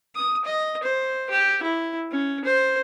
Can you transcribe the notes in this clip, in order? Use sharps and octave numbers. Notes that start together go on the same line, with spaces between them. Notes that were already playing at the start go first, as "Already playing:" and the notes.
D#6
D#5
C5
G4
E4
C#4
C5